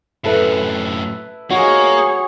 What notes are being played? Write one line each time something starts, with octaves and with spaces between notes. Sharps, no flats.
F#2 A2 E4 A4 B4
A#3 F#4 G#4 C#5